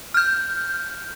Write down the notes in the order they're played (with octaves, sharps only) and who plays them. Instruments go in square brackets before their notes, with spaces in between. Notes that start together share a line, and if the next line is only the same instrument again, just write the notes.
[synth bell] F6 G6